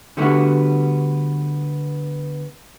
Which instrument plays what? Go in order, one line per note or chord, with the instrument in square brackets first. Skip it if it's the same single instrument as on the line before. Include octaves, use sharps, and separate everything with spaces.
[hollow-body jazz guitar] D3 G3 A3 B3 F#4